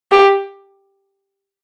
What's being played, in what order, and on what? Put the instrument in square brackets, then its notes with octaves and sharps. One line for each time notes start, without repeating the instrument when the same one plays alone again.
[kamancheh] G4